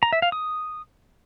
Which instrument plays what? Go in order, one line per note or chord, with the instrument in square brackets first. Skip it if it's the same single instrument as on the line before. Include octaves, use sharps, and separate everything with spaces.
[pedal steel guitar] A#5
E5
F5
D#6